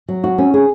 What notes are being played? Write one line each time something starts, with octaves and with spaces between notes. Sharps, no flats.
F#3
F#4
C#4
G#4